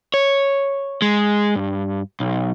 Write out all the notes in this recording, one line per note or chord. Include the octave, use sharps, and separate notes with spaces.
C#5
G#3
G2
B1